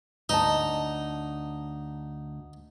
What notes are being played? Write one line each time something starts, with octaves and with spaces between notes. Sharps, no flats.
D2 D#4 A5